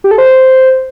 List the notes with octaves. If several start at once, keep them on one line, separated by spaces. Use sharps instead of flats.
G4
A4
C5